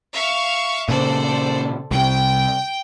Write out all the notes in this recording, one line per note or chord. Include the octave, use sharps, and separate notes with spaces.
E5 F5 C#6
A#2 C#3 A4 C5 D5
C2 G5